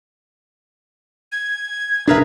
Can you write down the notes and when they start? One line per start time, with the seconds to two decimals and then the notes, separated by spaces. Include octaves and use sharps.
1.32 G#6
2.08 F1 B2 D4 G#4 A#4 B4 E5